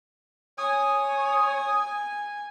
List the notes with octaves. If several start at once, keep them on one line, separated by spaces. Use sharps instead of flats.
C#5 G#5 D#6